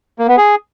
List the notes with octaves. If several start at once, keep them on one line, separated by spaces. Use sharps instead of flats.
A#3
B3
G#4